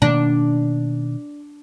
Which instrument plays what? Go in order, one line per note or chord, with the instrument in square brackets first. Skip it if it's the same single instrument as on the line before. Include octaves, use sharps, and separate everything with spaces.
[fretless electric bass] B2 D#3 A#3 [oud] D4